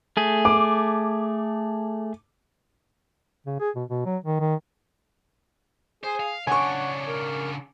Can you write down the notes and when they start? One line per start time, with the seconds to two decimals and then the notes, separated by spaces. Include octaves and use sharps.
0.17 A3 G#4
0.45 D6
3.46 C#3
3.60 G#4
3.76 B2
3.90 B2
4.05 F#3
4.24 D#3
4.40 D#3
6.04 G#4 C5
6.20 F5
6.47 C#3 D4 C#5 F#5 G#5 C#6
7.07 A#4